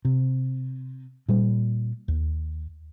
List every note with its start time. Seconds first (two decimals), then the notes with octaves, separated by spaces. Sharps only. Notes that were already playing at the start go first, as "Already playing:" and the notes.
0.05 C3
1.28 A#2 G3
2.08 D#2